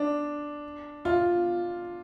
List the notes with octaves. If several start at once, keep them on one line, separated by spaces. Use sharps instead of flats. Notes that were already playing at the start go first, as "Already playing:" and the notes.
Already playing: D4
F4